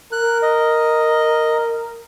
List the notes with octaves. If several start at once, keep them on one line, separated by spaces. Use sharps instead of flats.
A#4 F#6
D#5